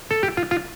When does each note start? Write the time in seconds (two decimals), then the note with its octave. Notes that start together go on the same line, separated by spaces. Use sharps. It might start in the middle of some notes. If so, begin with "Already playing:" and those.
0.11 A4
0.23 G4
0.37 F4
0.51 F4